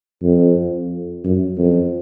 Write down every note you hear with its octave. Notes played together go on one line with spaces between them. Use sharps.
F2
F#2
F2